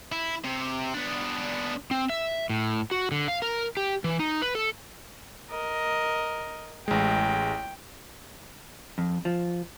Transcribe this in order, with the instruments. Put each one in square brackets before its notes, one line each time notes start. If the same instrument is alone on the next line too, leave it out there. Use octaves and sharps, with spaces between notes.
[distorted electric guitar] E4
C3
B3 D4
[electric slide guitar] C4
E5
A2
F#4
D3
F5
A#4
G4
E3
D#4
B4
A4
[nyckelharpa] A#4 D#5
[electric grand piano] A1 G#3 [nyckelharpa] G5
[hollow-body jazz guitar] F2
F3